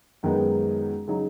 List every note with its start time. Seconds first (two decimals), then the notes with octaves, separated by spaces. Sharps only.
0.23 F#2 D#3 G#3 B3 D#4
1.07 C#3 F#3 D#4 F#4